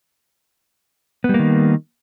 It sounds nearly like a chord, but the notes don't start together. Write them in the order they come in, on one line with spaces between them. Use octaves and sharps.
B3 G3 A#3 D#3